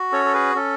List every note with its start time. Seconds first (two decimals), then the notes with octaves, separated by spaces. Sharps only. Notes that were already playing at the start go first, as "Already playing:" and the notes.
Already playing: F#4
0.12 C#4 A4 C#5
0.26 A4
0.34 G#4 B4
0.55 C#4 A4